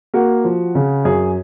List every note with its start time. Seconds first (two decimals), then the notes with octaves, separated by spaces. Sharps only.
0.14 A#3 F#4
0.45 F3
0.75 C#3
1.05 F#2 G#4